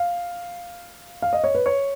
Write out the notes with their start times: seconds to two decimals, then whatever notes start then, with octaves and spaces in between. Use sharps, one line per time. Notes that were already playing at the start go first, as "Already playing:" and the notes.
Already playing: F5
1.22 F5
1.33 D#5
1.44 C#5
1.55 B4
1.66 C#5